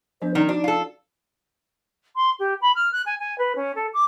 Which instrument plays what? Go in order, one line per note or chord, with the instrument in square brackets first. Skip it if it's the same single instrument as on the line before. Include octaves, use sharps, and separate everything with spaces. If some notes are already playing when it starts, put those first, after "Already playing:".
[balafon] F3 B3 D4 [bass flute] C5
[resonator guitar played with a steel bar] D#3 [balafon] C#4 D5 [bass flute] D#4
[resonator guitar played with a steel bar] D4 [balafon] F#4 C5
[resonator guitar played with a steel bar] F4 A4
[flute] C6
G4
B5
F6
F#6
G#5
G#5
B4
C#4
A4
D6